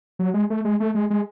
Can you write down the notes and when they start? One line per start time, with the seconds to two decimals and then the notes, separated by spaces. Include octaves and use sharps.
0.19 F#3
0.34 G#3
0.50 A3
0.65 G#3
0.80 A3
0.95 G#3
1.10 G#3